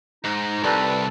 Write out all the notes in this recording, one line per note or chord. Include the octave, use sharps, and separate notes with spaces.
G#2 D#4
C2 G3 A4 B4